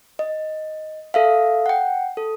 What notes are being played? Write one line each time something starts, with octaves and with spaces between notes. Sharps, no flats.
D#5
A4 E5 F5
F#5 G5
A4